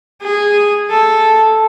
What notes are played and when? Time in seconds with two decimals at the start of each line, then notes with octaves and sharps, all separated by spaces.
0.23 G#4
0.91 A4